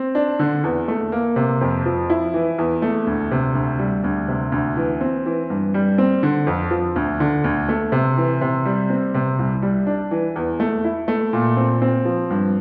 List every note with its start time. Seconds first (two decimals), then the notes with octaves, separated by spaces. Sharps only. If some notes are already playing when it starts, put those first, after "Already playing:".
Already playing: C4
0.15 D4
0.39 D3
0.64 E2
0.88 A3
1.12 A#3
1.36 C3
1.61 F2
1.86 F3
2.10 E4
2.34 E3
2.58 E2
2.82 A3
3.07 D2
3.31 C3
3.55 D2
3.79 G3
4.04 D2
4.28 C3
4.52 D2
4.77 E3
5.01 C4
5.26 E3
5.50 G2
5.74 G3
5.98 C4
6.23 D3
6.47 F2
6.71 F3
6.96 D2
7.20 D3
7.44 D2
7.69 A3
7.92 C3
8.17 E3
8.41 C3
8.65 G3
8.90 C4
9.14 C3
9.39 C2
9.62 G3
9.87 D4
10.11 E3
10.36 E2
10.60 A3
10.84 E4
11.08 A3
11.33 A#2
11.57 C4
11.82 C4
12.05 F3
12.30 G2